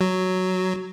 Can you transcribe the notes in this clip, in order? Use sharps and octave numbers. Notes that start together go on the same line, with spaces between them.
F#3